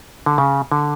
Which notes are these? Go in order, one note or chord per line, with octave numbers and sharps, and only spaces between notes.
D3
C#3
D3